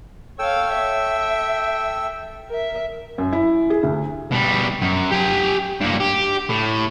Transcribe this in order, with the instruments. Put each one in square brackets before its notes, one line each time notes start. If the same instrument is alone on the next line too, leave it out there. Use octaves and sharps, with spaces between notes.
[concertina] A4 G5 E6 [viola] C#5 F5
[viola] E5
A#4 E5
[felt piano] F#2
E4
G#4
D2
[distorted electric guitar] B2 G3
F#2
G4 G#5
G2 A#3
G4
A2